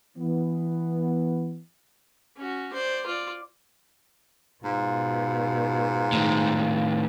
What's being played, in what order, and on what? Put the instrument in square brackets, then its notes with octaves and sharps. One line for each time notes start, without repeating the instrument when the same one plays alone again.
[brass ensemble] E3 B3
[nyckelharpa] C#4 F#4
C5 D5
F4 D5
[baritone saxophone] G#2 [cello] B2 [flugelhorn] F4
[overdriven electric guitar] A2 D#3